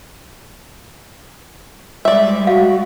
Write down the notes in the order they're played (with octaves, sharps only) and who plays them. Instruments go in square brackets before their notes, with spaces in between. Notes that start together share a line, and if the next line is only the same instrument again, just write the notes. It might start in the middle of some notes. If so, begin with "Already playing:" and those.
[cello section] G3 G#3 [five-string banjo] D5 E5
[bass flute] F#4 [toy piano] F5